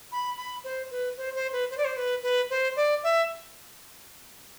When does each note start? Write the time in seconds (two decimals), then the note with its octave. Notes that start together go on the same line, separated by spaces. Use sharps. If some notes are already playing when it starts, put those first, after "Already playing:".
0.12 B5
0.37 B5
0.64 C5
0.91 B4
1.17 C5
1.35 C5
1.53 B4
1.71 C5
1.77 D5
1.85 C5
1.97 B4
2.23 B4
2.50 C5
2.76 D5
3.03 E5